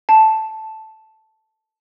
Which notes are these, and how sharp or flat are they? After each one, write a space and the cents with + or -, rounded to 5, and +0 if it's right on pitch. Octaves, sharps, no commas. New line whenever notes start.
A5 -5